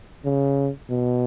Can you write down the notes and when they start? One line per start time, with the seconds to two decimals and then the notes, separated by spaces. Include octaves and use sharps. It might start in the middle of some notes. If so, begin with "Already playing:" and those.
0.25 C#3
0.89 B2